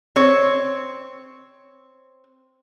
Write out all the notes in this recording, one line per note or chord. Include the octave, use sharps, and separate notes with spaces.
C4 C#5